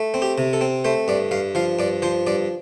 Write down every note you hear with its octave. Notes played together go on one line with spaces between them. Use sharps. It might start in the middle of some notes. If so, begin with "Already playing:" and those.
Already playing: A3
C4
G4
C3
A4
C4
A3 C5
G2 D5
G2 F5
F3 F5
G2 D5
F3 C5
G2 D5